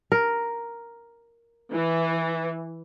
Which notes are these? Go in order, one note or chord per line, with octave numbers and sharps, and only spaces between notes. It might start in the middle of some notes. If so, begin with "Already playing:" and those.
A#4
E3